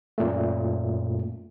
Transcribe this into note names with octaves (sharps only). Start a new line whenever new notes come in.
F#2 A#2 A3